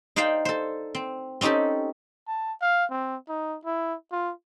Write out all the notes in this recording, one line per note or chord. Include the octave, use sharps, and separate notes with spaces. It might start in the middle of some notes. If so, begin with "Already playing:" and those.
D#4 C5 D5 F5 G5
A4 C5
C4
C4 C#4 D#4 G4 A4
A5
F5
C4
D#4
E4
F4